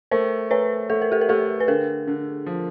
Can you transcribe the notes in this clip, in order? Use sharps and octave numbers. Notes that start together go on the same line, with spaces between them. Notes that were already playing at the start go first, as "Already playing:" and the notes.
A3 A#4 C5
A3 B4 C#5
A3 A4
A#4
G4 A4
A#4
A3 G4 A4
B4
D3 G#4 A#4
D3
F3